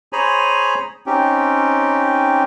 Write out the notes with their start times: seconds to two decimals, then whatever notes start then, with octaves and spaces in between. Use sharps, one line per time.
0.13 G#4 C5 C#5 G#5 A#5 B5
1.06 C4 C#4 D#4 G4